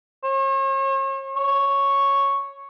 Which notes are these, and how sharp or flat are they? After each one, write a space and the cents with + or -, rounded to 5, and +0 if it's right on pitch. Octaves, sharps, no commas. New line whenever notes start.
C#5 -45
C#5 +0